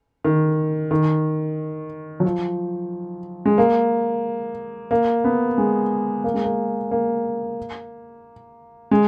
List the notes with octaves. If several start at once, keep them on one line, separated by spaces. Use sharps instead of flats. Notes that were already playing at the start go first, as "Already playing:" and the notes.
D#3
D#3
F#3
F3
G#3
A#3
A#3
B3
G#3
A#3
G#3
A#3
A#3
G#3